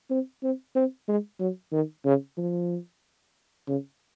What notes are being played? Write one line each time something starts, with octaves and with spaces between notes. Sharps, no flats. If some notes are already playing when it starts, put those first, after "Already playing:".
C4
C4
C4
G#3
F#3
D#3
C#3
F3
C#3